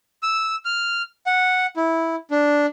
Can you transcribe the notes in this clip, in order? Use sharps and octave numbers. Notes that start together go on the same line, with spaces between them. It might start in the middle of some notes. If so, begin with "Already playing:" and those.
E6
F6
F#5
E4
D4